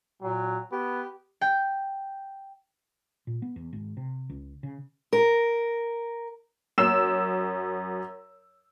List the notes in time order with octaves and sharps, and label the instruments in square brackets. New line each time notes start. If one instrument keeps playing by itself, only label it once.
[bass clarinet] A#2 [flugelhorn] F#3
[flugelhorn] B3 [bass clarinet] G4
[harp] G5
[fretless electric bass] A#2
B3
E2
G#1
C3
C#2
C#3
[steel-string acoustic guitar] A#4
[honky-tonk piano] F#2 E6 E7